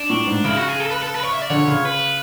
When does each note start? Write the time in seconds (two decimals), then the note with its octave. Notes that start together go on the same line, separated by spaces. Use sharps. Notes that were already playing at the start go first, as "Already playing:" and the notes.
Already playing: D4
0.10 A2
0.27 G#2
0.44 C#3 E4
0.56 F#4
0.68 G#4
0.80 A4
0.91 B4
1.03 A4
1.15 B4
1.23 C#5
1.33 E5
1.42 D5
1.50 D3 C#5
1.67 C#3
1.85 B4